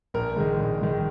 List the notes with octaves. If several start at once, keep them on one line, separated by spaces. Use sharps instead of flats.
A#1 A#4
G#2 D#3 G#3
A#1
G#2 D#3 G#3